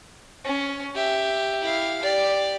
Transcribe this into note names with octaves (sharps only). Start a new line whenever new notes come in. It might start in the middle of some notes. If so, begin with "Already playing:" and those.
C#4
G4 E5
E4 F5
G4 D5